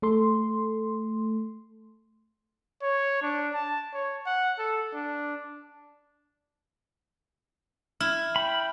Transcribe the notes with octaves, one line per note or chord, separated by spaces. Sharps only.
A3 A4 C6
C#5
D4
A5
C#5
F#5
A4
D4
E4 F6
G5 B5